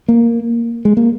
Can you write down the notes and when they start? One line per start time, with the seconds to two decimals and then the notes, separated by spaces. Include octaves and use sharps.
0.08 A#3
0.85 G#3
0.97 A#3